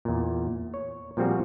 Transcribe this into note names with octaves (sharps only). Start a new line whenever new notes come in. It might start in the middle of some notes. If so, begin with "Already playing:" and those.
E2 A#2
C#5
A#2 F3 G3 C4 F#4 G#4